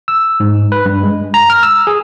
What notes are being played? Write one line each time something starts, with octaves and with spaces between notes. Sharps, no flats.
E6
G#2
B4
G2
G#3
A#5
F6
E6
G#4